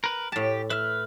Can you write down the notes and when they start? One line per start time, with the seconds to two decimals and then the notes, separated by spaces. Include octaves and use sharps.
0.04 A#4 B4
0.32 A2 G4 A5
0.70 B4 E5 F6